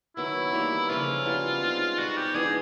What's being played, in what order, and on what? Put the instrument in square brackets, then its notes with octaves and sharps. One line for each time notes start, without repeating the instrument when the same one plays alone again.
[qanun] D#3 F#3 B3 [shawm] E4
[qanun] E3 G3 A#3
[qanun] C#3 F3 A#3 C#4 [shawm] F4
[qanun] G3 B3 E4 A4
G#3 C4 D#4
[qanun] B2 G3 B3 [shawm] F#4
[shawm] G4
[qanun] E3 G#3 B3 D4 [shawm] G#4